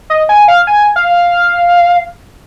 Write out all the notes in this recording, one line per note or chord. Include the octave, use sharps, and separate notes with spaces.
D#5
G#5
F5
G#5
F5